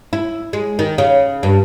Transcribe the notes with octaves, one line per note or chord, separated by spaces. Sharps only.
E4
G#3
D#3
C#3
G2